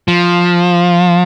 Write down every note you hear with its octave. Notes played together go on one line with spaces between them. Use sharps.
F3